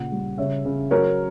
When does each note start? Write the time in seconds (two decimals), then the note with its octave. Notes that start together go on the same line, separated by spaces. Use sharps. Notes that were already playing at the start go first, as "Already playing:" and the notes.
Already playing: A#2 C#3 F#5
0.12 G3
0.38 C#3 C#5 E5
0.65 C#3
0.91 F#3 A#4 C#5